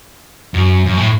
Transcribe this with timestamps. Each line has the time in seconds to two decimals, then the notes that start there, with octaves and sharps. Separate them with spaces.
0.54 F#2
0.86 F#2
0.97 A2